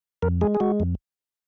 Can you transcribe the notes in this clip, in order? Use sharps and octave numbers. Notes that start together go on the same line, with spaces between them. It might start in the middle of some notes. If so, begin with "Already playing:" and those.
F2 A#4
G#3 G#4
G#4
G#3 F#4
F2